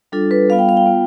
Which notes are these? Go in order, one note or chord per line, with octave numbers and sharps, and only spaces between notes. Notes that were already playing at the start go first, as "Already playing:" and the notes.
G3 D4 F4 A4
B4
G3 B3 F4 F5
G5
F5
G5
B3 F4